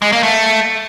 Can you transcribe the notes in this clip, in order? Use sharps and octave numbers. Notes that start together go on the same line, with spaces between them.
G#3
A#3
A3